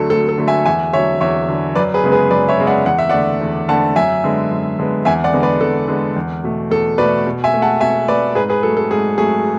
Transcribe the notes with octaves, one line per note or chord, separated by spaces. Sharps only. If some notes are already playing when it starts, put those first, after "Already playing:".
Already playing: D2 D3 F#3 A3 A4
D2 A4
A4
D3 F#3 A3
E5 G#5
E2 E5 G#5
D3 F#3 C#5 E5
E2 C#5 E5
D3 F#3
F#2 B4 D5
G#4 B4
C#3 G#3 B3
G#4 B4
F#2 B4 D5
C#5 E5
C#3 G#3 B3
D5 F#5
E2 F#5
E5
D3 A3 D5 F#5
E2
D3 A3 F#5 A5
F#2 E5 G#5
D3 G#3 B3
F#2
D3 G#3 B3
E2 E5 G#5
D5 F#5
D3 G#3 B3
B4 D5
E2 A4
D3 G#3 B3
E2
B2 A3
E2 A4
B2 A3 B4 D5
B2
E5 G#5
A3
F#5 A5
B2 E5 G#5
A3 B4 D5
G#2 G#4 B4
G#4 B4
F#3 A3 A4
A4
G#2 G#4
F#3 A3 G#4